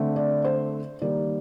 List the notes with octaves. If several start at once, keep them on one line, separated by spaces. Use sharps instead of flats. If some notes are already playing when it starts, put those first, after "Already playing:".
Already playing: D3 A3 C4
D5
C5
D#3 G3 A#3 D5